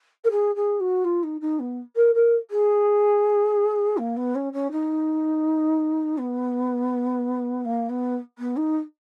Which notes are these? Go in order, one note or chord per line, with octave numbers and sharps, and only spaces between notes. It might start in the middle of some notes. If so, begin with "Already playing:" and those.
A#4
G#4
G#4
F#4
F4
D#4
D#4
B3
A#4
A#4
G#4
A#3
B3
C#4
C#4
D#4
B3
A#3
B3
B3
D#4